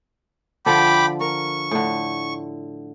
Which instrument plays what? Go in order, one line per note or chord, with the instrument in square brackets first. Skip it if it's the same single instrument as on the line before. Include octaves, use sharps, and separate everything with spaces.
[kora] D3 F3 [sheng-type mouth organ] G5 B5 D6
[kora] A#4 [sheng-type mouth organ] C#6
[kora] A2 D3